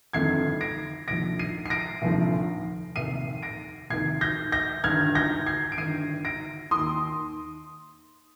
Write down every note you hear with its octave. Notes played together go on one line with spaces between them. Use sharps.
G1 F2 D#3 G#6 C7
A#6 D7
F1 D#2 D3 F3 A#6 D7
C7 D#7
C7
A#6 D7
F1 D#2 D3 F3
F1 D#2 D#3 C7 D#7
A#6 D7
F1 D#2 D#3 G#6 C7
G6 A#6
G6 A#6
G1 G2 D#3 F6 G#6
G6 A#6
G#6 C7
D7
G1 G2 D#3 C7 D#7
A#6 D7
D#2 D#3 C6 D#6